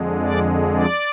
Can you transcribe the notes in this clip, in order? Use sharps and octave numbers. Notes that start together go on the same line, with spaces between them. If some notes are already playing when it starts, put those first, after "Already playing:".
Already playing: F2 D3 G#3
D5
D5